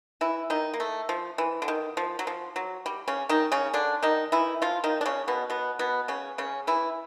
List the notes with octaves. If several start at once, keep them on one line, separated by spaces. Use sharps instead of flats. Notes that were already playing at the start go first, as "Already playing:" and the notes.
E3 E4
D#3 D#4
A#3
A3
F3
E3
D3
D#3
F3
F#3
F3
F#3
G3
C#3 C#4
D#3 D#4
C#3 C#4
D3 D4
D#3 D#4
E3 E4
F3 F4
D#3 D#4
D4
C#3 C#4
B2 B3
B2 B3
B2 B3
C#3 C#4
C#3 C#4
E3 E4